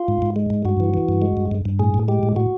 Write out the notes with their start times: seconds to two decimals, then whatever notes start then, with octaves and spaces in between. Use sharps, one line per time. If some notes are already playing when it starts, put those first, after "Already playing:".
Already playing: F4
0.08 G#2
0.22 G#2
0.36 G#3
0.50 G#2
0.65 G2 F#4
0.80 E3
0.94 E3
1.09 G2
1.22 G#3
1.37 G2
1.51 G2
1.65 G2
1.79 A2 G#4
1.94 A2
2.08 G#3 G4
2.23 A2
2.36 A2 F#4